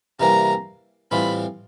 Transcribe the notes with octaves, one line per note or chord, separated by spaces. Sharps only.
C3 E3 G3 A#3 A#5
A2 E3 G3 C4 F4 B5